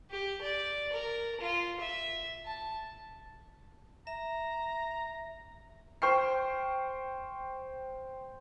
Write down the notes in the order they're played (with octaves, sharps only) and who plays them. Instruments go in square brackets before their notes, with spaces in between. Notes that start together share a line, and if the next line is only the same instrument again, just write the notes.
[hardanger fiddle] G4
D5
A#4
F4
E5
A5
[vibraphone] E5 [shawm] A#5
[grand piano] C5 G5 C#6 F6 C7